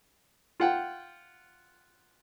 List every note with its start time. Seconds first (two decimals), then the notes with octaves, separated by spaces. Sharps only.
0.60 F4 F#5 G5